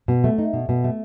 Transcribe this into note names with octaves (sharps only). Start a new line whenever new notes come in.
B2
A3
D#4
B2
B2
A3